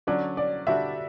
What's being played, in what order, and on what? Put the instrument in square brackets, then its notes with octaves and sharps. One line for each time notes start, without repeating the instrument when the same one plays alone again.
[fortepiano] D3 F#3 C#4 [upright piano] D5
[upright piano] D5
[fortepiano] D3 G3 D4 F#4 [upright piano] E5